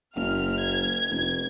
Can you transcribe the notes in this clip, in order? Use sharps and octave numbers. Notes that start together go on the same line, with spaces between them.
F#1 F6
G#6
F1